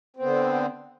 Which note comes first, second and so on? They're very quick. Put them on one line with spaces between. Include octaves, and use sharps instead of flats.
C4 B3 D3